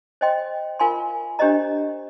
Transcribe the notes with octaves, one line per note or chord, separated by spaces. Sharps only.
C5 D#5 G5 C6
F4 A#4 F5 G#5 C6
D4 G4 C5 D#5 A#5